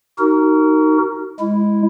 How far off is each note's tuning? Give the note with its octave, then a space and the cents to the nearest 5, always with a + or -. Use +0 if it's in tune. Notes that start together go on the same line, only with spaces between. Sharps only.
D#4 +0 F#4 +30 A#4 -15
G#3 +0 E4 +0